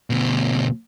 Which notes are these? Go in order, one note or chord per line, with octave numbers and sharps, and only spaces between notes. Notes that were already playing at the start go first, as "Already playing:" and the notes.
D2 B2